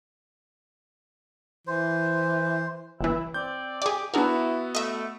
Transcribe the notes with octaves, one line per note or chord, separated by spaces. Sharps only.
E3 C5
G1 E3 E4
C4 D5 G6
G4 G#4 D5 D6
B3 D4 E4 F#4 G#4 A#4
A3 D#5 E5